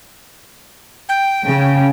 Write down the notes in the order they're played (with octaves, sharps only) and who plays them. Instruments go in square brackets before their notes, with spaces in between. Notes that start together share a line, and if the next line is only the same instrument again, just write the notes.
[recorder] G5
[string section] C#3